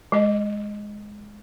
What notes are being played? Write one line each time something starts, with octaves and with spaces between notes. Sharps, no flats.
G#3 D#5